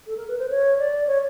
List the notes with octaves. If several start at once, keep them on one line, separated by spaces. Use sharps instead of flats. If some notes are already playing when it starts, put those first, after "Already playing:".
A4
A#4
B4
C5
C#5
D5
C#5